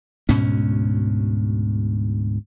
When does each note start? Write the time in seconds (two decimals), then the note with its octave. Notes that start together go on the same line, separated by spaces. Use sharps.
0.29 D2 G#2 B2 C#4